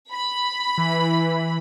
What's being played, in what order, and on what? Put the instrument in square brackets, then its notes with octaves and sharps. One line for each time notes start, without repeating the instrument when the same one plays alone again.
[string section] B5
[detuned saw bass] E3